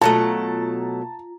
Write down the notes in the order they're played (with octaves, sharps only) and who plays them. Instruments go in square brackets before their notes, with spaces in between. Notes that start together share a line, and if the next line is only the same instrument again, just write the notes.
[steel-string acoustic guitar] B2 F#3 A3 [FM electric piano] F4 A#5 [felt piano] A5